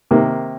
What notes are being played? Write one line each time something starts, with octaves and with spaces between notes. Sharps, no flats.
C3 D#3 A#3